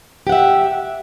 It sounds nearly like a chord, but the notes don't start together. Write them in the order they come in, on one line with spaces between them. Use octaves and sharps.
G4 F#5 E5